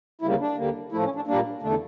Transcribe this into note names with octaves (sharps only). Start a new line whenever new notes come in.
D2 C#3 G3 A#3 E4
D4
D2 D3 G3 A#3
A2 F3 A3 E4
C#4
D4
A#2 G3 A#3 D4
E2 D3 A3 D4